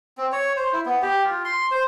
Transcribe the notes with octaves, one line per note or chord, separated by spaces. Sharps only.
C4
C#5
C5
E4
B3
G4
F4
C6
C5